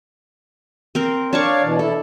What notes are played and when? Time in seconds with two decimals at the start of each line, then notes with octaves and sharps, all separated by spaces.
0.95 C4 A#4
1.33 D4 C#5 D5 F5 A5 C#6
1.63 B2 E3
1.79 E4 A4